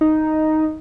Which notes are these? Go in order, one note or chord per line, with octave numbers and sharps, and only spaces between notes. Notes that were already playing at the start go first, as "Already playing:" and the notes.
D#4